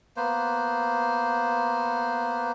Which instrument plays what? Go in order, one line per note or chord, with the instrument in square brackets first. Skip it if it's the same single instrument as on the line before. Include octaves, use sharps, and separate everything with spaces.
[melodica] A#3 B3 C5